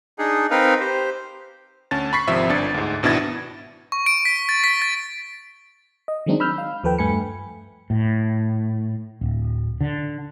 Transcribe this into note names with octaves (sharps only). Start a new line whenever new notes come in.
D4 D#4 G#4
C4 D#4 A#4 B4 F5
G4 C5
D2 C#4 A5 A6
B5 C#6 B6 C7
G#1 C3 F3 E5 B6
G1 D4 A6 C#7
D2 G#2
G#1 B2 D4 E4 G#6 A6
C#6
D7
B6
A6
B6
A6
D#5
D#3 F#3 G#3 C4 D4 D#4
B5 E6 F6 G6
F5
D#2 F3 A4 B4 G5
G2 A3 G#5 B5 C#7
A2
D1
D3